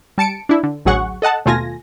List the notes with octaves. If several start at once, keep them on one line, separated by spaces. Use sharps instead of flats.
G3 A5 C#7 D7
D4 E4
D3
A1 D2 F#3 G#4 F#5 C#6
A4 D#5 F#5 A5
D#2 B2 A3 F4 G#5 A#6